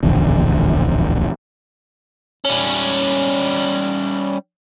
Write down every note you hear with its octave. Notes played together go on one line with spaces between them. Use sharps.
D1 A#1 E2 D3
G3 C#4